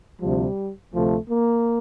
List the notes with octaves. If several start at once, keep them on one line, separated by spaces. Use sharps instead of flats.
D2 C3 F3 G3
D2 C3 F3 A3
A#3